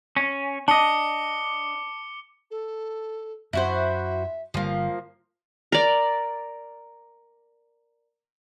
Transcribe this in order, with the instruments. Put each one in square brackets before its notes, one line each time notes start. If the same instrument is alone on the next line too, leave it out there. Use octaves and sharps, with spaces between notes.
[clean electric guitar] C#4
[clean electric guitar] D4 D#5 [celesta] A5 [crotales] D6 C#7 G7
[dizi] A4
[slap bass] F#2 [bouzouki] E4 F#4 C5 [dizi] E5
[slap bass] G1 G3 [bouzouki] F3 A#3
[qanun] A#4 D5